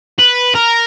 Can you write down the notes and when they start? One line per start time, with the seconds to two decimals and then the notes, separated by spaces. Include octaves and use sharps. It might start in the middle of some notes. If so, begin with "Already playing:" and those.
0.19 B4
0.55 A#4